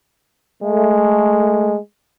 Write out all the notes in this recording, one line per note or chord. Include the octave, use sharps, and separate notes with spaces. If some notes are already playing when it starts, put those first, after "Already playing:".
G#3 A3